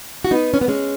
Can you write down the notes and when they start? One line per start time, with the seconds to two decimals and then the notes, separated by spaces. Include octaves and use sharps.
0.25 F#4
0.31 B3 D#4
0.54 C#4
0.61 B3
0.68 G#3 C#4